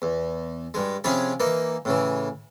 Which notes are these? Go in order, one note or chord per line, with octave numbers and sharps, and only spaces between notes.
E2
G2 G#3
C3 F3 C#4 G#4 B5
E3 A#3 D#4
A2 C#3 E3